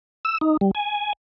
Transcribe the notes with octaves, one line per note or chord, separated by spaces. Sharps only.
E6
D#4
G3
G#5